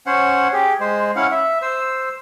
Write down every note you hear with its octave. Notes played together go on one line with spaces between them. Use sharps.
C#4 C5 C#5 F#5
G4 G#4
G#3 C5
C#4 E4 F5 F#5
E5
C5 E6